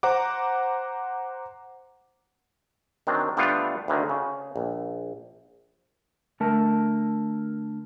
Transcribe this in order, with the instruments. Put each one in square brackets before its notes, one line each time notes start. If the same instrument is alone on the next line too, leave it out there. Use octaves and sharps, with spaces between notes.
[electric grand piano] C5 F#5 A#5 D6
[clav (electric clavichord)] D#3 F#3 C4 D4
D3 G3 A3 B3 D4 F4
D2 D3 D#3
C#3
A#1
[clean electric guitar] D3 A3 A#4 A5